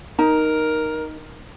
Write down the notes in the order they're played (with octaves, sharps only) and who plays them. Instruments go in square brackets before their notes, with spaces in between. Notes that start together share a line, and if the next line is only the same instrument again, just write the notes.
[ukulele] D#4 [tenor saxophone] A#4